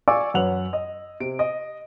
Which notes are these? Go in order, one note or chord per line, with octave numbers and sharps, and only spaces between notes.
D5 F5 G#5 C#6 D6 E6
F#2 C#4 B4 F#5 F7 F#7
D#5
C3 D7
D#5